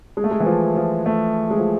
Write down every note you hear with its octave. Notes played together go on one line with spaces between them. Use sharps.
G#3
A3
G#3
E3
F3
F3
A3
G#3
F3